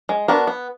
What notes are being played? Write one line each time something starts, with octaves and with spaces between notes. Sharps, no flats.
G#3
B3 D4 F#4 A#4
B3